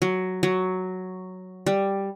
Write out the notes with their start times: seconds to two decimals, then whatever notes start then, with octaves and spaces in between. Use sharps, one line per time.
0.02 F#3
0.43 F#3
1.66 G3